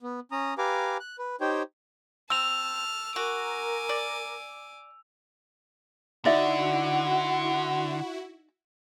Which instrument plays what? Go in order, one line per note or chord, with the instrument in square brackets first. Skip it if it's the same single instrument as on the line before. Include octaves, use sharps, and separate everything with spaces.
[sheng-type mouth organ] B3
C#4 A#5 D#6
G4 B4 F5 G#5 A#5 D6
F#6
B4
D#4 G4 C5 C#5 G5
[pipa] C4 [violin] A5 F6 [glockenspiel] E6 F7
[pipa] F#4 [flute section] A#4 [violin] G#5 D6
[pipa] D5
[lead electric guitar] D3 [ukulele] D#4 D5 E5 [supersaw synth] E4 F#4 [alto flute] F#5